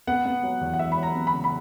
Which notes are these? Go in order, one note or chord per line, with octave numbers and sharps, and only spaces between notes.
B3 F#5
B3
F#3
E2
F#5
E2 E5
B5
F#3
A#5
B3
B5
C#3
B5